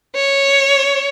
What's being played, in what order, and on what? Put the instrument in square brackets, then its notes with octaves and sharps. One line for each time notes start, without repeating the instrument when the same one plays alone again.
[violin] C#5